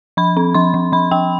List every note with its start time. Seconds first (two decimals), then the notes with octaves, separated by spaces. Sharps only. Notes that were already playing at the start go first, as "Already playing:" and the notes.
0.17 F3 B5
0.37 C4
0.54 F3 C6
0.74 F3
0.92 F3 B5
1.11 F3 G5